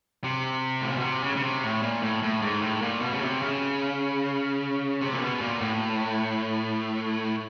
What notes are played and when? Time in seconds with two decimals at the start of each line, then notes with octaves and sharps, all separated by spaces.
0.24 C3
0.82 A2
0.90 A#2
0.97 B2
1.03 C3
1.23 C#3
1.36 C#3
1.44 C3
1.63 A2
1.82 A#2
2.02 A2
2.23 A2
2.42 G#2
2.62 A2
2.82 A#2
3.01 B2
3.13 C#3
3.22 C3
3.42 C#3
5.01 C3
5.13 A#2
5.21 B2
5.41 A#2
5.61 A2